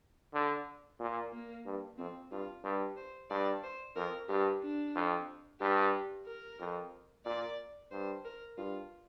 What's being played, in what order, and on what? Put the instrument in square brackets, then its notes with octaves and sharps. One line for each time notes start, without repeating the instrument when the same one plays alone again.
[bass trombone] D3
A#2
[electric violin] A#3
[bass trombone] G2
[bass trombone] F2 [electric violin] C4
[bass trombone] G2 [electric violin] F4
[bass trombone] G2 [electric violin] G4
[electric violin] C5
[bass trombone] G2 [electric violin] D5
[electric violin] C5
[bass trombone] F2 [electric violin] A#4
[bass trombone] G2 [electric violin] G4
[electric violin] D4
[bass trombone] F2
[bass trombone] G2 [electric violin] G4
[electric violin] A#4
[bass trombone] F2
[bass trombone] A#2 [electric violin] D5
[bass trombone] G2 [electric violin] C5
[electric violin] A#4
[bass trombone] G2 [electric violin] F4